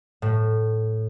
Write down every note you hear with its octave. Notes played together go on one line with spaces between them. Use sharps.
A2